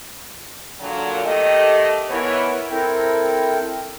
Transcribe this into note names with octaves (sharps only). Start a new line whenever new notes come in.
A#2 D3 F#3
D#3 A3 G4 D#5
E3 B3 E4 A#4 C#5
C4 E4 A4 A#4 G5